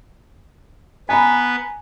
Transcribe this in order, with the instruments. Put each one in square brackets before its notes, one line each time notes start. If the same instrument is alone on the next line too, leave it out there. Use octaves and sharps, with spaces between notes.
[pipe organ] B3 B4 [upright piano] G#5 A#5 B5